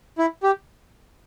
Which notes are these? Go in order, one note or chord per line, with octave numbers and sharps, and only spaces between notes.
E4
G4